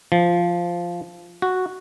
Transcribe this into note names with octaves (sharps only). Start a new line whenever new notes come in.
F3
F#4